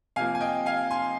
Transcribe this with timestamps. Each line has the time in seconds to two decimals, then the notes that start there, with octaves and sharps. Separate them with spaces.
0.16 C3 F3 A#3 F5 G#5
0.35 G#5
0.41 D#5 G5
0.66 F5 G#5
0.90 G#5 C6